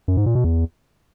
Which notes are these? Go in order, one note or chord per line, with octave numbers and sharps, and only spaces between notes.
F#2
G#2
A#2
B2
E2